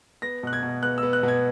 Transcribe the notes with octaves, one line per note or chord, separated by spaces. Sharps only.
B3 A#6
B2 F#6
G#6
B2
B3 F#6
B3 E6
F#6
B2
G#6